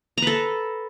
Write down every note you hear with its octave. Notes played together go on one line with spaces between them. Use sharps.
A4 B4 A#5